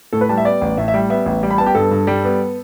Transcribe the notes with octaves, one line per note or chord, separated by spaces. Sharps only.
A2 A4
B4
G3 A5
E5
B3 D5
A1
A2 E5
E5
G3
B3 E5
A1
G3
B5
B3 A5
G4
G2 A4
G2
G3
B3